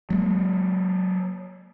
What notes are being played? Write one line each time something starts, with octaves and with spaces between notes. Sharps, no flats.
F#3 G#3 A#3